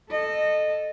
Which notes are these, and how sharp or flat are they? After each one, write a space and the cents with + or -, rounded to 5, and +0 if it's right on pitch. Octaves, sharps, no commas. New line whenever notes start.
A4 -5 D#5 -20